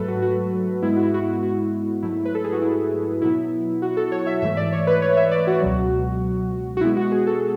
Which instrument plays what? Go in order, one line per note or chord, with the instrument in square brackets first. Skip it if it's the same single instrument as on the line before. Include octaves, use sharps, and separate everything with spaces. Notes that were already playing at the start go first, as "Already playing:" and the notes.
Already playing: [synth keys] G#2 F#3 A3 A4 B4
F#4
F#4
G#2 G#3 B3 E4
F#4
E4
F#4
E4
F#4
G#2 F#3 A3 E4
B4
A4
G#4
F#4
E4
B2 F#3 B3 E4
F#4
A4
C#5
E5
G#2 E3 A3 E5
D5
C#5
B4
C#5
E5
D5
F#4
C#2 B2 F#3
F#4
B2 G#3 B3 E4
F#4
G#4
A4